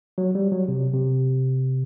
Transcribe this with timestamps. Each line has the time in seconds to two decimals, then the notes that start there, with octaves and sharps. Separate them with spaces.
0.18 F#3
0.35 G3
0.52 F#3
0.68 C3
0.94 C3